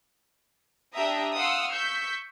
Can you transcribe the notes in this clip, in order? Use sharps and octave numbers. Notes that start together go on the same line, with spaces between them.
D4 G4 E5 A#5 D#6
F5 F#5 C6 D#6 E6
C#6 E6 G6 B6